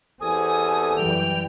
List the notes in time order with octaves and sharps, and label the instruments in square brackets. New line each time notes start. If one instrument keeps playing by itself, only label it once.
[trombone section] E2 G4 A4 [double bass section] C4 [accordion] G#5 [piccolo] D#6
[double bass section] F#2 E3 G3 [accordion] G5 [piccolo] F7